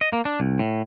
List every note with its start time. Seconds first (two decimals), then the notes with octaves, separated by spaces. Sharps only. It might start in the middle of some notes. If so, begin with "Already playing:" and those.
0.01 D#5
0.13 A#3
0.25 D4
0.40 C2
0.59 A2